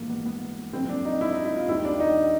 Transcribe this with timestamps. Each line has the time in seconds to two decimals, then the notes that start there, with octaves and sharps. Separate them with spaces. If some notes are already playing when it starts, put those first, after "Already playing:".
Already playing: A#1 G#2 E3 G3 A#3
0.10 B3
0.26 B3
0.73 F#1 F2 C3 C4
0.90 D4
1.05 D#4
1.21 E4
1.32 D#4
1.45 E4
1.56 F4
1.68 D#2 D#3 G3 E4
1.85 D4
2.00 D#4